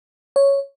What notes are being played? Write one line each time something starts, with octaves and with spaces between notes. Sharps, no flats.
C#5